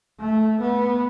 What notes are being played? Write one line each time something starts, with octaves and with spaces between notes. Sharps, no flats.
A3
B3